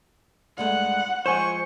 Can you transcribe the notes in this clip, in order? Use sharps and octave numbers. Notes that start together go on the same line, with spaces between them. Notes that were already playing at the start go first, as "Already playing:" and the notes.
G2 G#3 A3 F#5
F3 G#3 C5 G#5 C#6